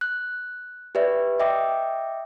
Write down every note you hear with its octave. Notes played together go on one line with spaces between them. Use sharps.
F#6
G4 B4 D5 E5
D#5 E5 G5 D6